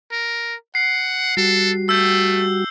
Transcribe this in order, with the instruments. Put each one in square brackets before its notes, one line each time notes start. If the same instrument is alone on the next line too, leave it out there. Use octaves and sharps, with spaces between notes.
[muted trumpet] A#4
[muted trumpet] F#5 [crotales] C7
[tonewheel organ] G3 F#4 [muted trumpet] A4
[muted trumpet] A3 [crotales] E6 G6 G7